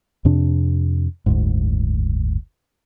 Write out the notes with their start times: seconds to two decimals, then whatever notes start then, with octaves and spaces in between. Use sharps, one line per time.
0.25 F2 C3 D4
1.26 F#1 D2 G#2